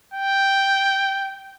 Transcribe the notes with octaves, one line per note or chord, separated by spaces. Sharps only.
G5